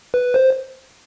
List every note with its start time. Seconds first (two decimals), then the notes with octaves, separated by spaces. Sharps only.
0.14 B4
0.34 C5